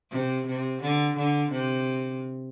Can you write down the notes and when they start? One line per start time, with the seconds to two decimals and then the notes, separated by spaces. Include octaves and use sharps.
0.11 C3
0.46 C3
0.82 D3
1.16 D3
1.51 C3